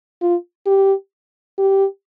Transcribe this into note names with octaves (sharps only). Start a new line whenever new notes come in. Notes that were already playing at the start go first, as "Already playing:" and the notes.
F4
G4
G4